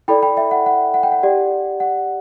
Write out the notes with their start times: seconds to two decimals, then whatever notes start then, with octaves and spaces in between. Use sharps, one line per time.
0.08 E4 A4 D5 G5 B5
0.22 G5 B5
0.37 E5 G5
0.51 F#5
0.66 F#5
0.94 F#5
1.03 G5
1.12 F#5
1.23 G4 D5
1.80 F#5